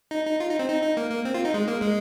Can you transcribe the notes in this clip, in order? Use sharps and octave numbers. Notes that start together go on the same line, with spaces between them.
D#4
D#4
F4
D#4
C4
D#4
D#4
A#3
A#3
C4
F4
D#4
G#3
A#3
G#3